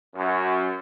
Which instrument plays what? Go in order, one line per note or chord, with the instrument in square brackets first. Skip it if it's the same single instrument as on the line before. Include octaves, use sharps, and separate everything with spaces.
[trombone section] F#2